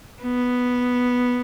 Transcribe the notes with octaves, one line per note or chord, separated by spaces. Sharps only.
B3